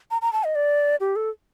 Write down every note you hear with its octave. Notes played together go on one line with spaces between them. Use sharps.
A#5
A#5
A5
D#5
D5
G4
A4